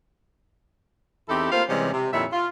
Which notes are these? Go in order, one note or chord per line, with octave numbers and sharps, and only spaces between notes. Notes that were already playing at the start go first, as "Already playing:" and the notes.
E2 C4 D#4 E4 G4 A4
A3 A#3 C4 F4 C5 F5
C3 E3 G3 G#3 C4 C#4
C3
F2 A#2 D#3 E4 C#5 E5
F4